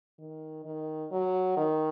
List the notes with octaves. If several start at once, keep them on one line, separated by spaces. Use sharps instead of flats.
D#3
D#3
F#3
D#3